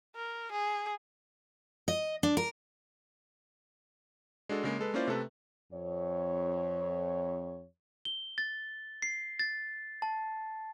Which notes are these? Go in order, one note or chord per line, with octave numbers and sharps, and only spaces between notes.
A#4
G#4
D#5
D4
A#4
G#3 D4 F#4 A4
C#3 G#3 A#3
G#3 A4 B4
A#3 C#4 E4 F4 C5 D5
C3 A3 A4 B4
F2 C#5
G7
A6
C7
A6
A5